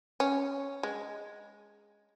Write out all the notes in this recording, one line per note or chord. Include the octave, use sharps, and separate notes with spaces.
C#4
G#3